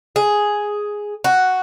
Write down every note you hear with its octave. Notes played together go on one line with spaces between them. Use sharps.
G#4
F#4